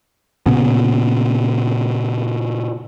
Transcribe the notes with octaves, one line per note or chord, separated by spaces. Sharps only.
A#2 C#3 B3 C#4